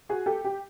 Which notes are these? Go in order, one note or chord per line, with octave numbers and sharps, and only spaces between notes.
F#4 G#4
G4 A4
G4